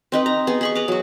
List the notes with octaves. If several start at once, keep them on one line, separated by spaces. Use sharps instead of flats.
C4 D#4 B4
A#5
B3 G#4
G#4 B5 C#6
B4 A#5 D6
F#3 F#4